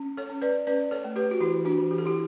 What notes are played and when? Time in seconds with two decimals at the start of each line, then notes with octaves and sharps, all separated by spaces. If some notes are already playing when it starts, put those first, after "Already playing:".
Already playing: C#4
0.17 A4 C#5
0.30 C#4
0.42 B4 D5
0.67 C#4 B4 D5
0.91 A4 C#5
1.04 A3
1.16 G4 B4
1.31 F#4
1.40 E3 E4 G4
1.65 D4 F#4
1.78 E3
1.91 G4
1.98 A4
2.06 E4 G4